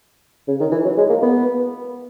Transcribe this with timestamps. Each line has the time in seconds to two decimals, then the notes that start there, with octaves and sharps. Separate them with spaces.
0.47 C#3
0.60 D#3
0.71 E3
0.84 F#3
0.97 G#3
1.09 A#3
1.22 B3